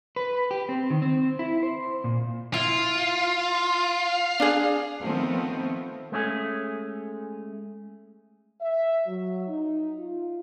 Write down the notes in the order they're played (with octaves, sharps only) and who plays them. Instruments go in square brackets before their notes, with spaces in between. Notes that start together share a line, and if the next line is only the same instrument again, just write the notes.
[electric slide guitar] B4
G4
C4
D#3
C4
E4
C5
A#2
[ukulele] E4 [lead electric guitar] F4
[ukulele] D4 G#4
[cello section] D#3 F3 A3 B3 C4
[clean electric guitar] G#3 A3 C#4 F#4 G#4
[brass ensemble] E5
F#3
D#4
F4